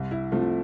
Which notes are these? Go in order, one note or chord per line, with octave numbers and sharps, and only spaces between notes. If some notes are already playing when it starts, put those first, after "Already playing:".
Already playing: C2
E4
C3 F3 A3 F4